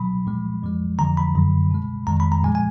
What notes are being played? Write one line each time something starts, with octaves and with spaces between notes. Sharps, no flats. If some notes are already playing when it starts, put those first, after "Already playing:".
Already playing: B2 F#3 B5
A#2 F3 G#3
F2 F3 G#3
F2 D3 F3 A#5
B5
F#2 D3 F#3
B2 G#3
F2 D#3 G#3 A#5
B5
A#5
A#2 F3 G#3 G#5
G#5